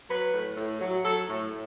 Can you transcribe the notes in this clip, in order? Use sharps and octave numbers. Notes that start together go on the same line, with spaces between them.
F#3 B4
A2
A2
F#3
F#3 A4
A2
A2